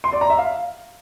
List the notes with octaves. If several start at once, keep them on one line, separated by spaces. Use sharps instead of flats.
C6
D5
A#5
E5
F5